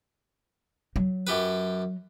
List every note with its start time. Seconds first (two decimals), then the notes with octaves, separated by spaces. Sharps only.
0.96 F#3
1.27 F#2 G4 B4